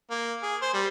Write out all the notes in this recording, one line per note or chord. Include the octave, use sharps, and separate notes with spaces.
A#3
G#4
C5
G3